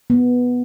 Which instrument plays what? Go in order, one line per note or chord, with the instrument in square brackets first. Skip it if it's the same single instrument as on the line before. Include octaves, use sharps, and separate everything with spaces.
[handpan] B3